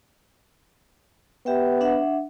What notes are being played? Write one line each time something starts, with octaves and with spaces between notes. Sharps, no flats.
B3 G4 E5 G5
D4 E5 F#5